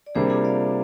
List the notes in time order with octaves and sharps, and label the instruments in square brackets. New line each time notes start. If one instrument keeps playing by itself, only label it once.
[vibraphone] D5
[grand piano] C3 G3 A#3 D4 [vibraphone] G#4 C5
[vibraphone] F4 G#4
D5 F5